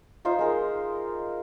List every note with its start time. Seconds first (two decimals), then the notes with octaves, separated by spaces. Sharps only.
0.25 D#4 F4 C5 E5
0.39 G#3 A#4